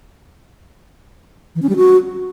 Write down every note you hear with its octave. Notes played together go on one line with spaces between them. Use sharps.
E3
C#4
G3
F#4